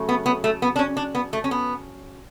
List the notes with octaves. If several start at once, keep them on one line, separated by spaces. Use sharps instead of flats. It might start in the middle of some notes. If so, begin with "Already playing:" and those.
Already playing: C#3 F#3 A3
B3
B3
A3
B3
D4
C#4
D4
B3
A3
C#4
B3